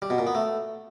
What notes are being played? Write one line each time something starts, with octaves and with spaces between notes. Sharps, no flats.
G3
B2
A#2
B3
A3